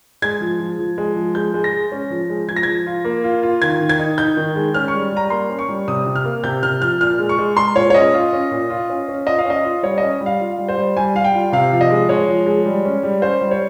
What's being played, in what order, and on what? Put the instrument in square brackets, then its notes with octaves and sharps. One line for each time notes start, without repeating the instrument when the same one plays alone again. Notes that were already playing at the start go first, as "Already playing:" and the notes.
[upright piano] G#3 G#6
F3
F3
F3
G#3
F3
G#3 G6
G#3
A#6
G#3
C#4
F3
G#3
F3 G#6
A#6
F3 G#6
F4
A#3
F4
F4
D#3 G#6
D#3
G#6
D#4
D#4 G6
D#3
G#3
C#4 F6
C#6
G3
G3 A#5
A#3 C6
C#4
C#6
G3
C3 D#6
C3
F6
A#3
C3 G6
C3 F6
F3 F6
A#2 F6
G#3
C#6
G#3
G#3 C6
A#2 C#5
C#5
C#4 D#5
F4
C#4
A#2
F4
C#4
C#4
F4 D#5
F5
C#4 D#5
F4
G3 C#5
C#4 D#5
G3
F5
F4
G3
C5
G3
G3 G#5
G3 F5
G5
F4
C3 F5
F3
D#5
G#3
G#3 C#5
F3
G#3
G3
C#4
G3
C#4 C5
G3
C#5